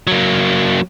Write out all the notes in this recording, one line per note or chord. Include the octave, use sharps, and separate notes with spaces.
F#3 A#3